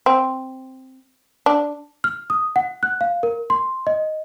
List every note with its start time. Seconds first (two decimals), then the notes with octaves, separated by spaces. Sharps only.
0.06 C4
1.46 D4
2.04 F6
2.30 D#6
2.56 F#5
2.83 F#6
3.01 F5
3.23 A#4
3.50 C6
3.87 D#5